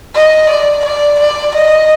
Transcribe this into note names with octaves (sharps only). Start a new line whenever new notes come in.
D#5
D5
D5
D5
D#5